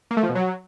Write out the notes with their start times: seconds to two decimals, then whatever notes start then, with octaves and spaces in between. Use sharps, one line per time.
0.11 A#3
0.17 A3
0.23 F3
0.29 B2
0.35 F#3